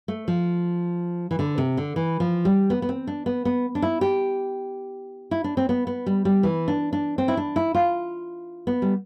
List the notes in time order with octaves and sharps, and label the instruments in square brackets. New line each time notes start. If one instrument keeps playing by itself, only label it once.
[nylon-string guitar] A3
F3
E3
D3
C3
D3
E3
F3
G3
B3
B3
C4
D4
B3
B3
D4
E4
G4
E4
D4
C4
B3
B3
G3
G3
E3
D4
D4
C4
E4
D4
E4
F4
B3
G3